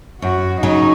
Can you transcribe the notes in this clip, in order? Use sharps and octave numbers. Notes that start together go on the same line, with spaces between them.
F#2 F#4
C#3 F#3 D#4